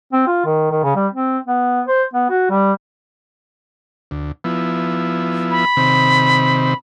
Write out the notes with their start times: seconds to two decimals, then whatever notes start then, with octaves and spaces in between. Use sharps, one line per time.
0.13 C4
0.27 F4
0.46 D#3
0.72 D#3
0.83 C#3
0.96 G3
1.13 C4
1.47 B3
1.88 C5
2.13 B3
2.30 F#4
2.50 G3
4.11 D2
4.44 F3 B3 E4
5.51 B5
5.77 C3 D#3 C4